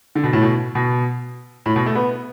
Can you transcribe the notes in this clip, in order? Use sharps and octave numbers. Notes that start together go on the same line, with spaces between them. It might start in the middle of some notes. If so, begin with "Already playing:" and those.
D3
B2
A2
B2
B2
A2
B2
A3
B3